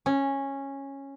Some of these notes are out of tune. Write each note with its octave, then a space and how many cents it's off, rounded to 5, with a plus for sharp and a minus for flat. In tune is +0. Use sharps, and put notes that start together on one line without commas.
C#4 -10